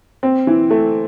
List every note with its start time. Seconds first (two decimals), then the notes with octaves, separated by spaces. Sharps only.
0.23 C4
0.47 E3
0.70 A3